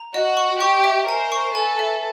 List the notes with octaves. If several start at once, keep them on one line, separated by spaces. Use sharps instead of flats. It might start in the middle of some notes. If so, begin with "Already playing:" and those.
Already playing: A#5
F#4 D#5
C#6
G4 C#6
E5
A#4 C5 G#5
C#6
A4 B4 G#5
E5